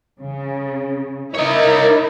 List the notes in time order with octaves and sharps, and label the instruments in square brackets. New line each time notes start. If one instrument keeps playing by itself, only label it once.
[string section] C#3
[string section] D#4 E4 A#4 [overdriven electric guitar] C#5 D#5